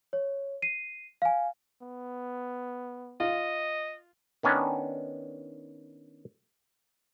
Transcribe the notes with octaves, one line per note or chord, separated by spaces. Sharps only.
C#5
C7 D#7
F5 G#5
B3
F4 D#5
D#3 B3 C#4 D4